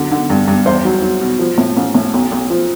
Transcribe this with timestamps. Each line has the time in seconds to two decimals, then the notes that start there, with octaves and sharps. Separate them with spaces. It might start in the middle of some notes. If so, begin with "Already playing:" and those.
Already playing: D3 F#3
0.11 D3
0.30 G2
0.48 G2
0.66 E2 C5
0.85 F#3
1.02 F#3
1.21 B2
1.39 F3
1.58 A2
1.76 A1
1.94 A2
2.14 B1
2.32 B1
2.50 F3